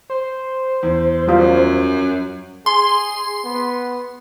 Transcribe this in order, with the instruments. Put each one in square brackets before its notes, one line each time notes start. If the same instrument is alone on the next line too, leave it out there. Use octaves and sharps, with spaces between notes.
[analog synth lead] C5
[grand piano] E2
[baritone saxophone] F#2 [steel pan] G3 F4
[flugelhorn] G#4 [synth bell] C6
[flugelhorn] B3